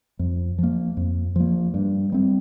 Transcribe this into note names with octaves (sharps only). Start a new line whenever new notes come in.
F2
F3 A#3
F2
F3 A#3
G2
G3 C4